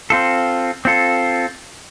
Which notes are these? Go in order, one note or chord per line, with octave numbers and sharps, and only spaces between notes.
C4 F4 A4
C4 F4 A4